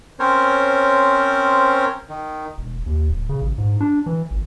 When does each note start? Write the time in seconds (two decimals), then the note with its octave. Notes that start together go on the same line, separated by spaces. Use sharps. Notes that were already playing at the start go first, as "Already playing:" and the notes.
0.20 C4 C#4 A#4 C5 C#5
2.09 D#3
2.58 E1
2.86 D#2
3.09 D1
3.29 C#3
3.41 A1
3.58 G#2
3.81 D4
4.06 E3
4.31 G#1